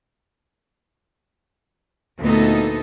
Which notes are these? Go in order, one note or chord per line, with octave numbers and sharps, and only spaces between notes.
D2 A#2 A3 B3 D#4 A4